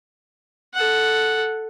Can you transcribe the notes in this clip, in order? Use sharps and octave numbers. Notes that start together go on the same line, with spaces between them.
A4 F#5